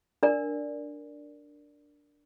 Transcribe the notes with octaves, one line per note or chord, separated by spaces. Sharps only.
D4 A#4 D5